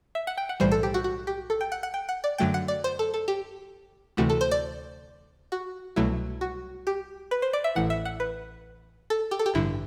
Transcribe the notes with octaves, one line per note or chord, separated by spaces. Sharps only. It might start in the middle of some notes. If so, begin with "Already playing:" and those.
E5
F#5
G5
F#5
B1 A2 E3 G3 C5
A4
G4
F#4
F#4
G4
A4
G5
F#5
F#5
G5
F#5
D5
F#2 D3 F#3 A3 G5
F#5
D5
C5
A4
A4
G4
D2 C3 E3 A3 F#4
A4
C5
D5
F#4
C2 B2 F#3 A3 E4
F#4
G4
B4
C5
D5
E5
A1 A2 E3 F#5
E5
F#5
B4
A4
G4
A4
G4
A1 G2 D3 E4